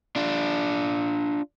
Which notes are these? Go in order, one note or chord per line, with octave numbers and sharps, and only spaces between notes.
D4 F4